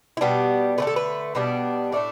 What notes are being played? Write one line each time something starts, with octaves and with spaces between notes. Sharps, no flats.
E4
B2 G3 B3 D4 G4
D3 A3 D4 B4
A4
B4
B2 G3 B3 D4
A2 A3 D4 D5